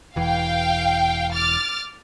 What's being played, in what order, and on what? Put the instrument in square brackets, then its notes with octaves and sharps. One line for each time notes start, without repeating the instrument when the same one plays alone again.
[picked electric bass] E1 E3 [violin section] F5 G5
[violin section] D6 F6 A6